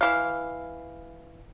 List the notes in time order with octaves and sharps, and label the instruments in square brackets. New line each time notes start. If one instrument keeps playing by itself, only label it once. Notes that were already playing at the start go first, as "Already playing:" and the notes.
[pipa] E3 F5